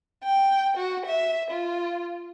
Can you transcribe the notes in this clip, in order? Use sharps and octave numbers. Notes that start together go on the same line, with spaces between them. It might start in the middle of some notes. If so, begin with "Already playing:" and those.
G5
F#4
E5
F4